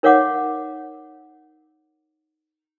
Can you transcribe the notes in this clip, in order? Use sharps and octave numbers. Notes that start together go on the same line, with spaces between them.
D#4 A#4 C#5 F5 F#5 D6